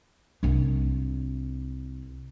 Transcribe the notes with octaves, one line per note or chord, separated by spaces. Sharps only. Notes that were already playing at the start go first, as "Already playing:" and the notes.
C2 D4